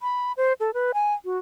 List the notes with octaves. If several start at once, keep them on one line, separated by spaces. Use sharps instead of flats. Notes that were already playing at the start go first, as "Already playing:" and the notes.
B5
C5
A4
B4
G#5
F#4